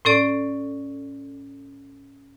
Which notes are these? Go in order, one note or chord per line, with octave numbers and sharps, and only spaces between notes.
A2 C#4 A4 D5